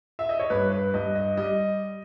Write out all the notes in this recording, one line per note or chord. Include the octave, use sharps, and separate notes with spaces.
E5
D#5
C#5
G2 B4
B4
G2 D#5
D#5
G3 D#5